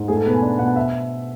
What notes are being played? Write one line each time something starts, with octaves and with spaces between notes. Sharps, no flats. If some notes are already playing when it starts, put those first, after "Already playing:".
Already playing: G#2
A3 G#4
A4
B2 B4
G#5
D4
B2 F#5
E5